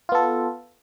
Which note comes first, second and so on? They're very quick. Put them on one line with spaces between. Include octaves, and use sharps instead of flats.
F4 B3 A4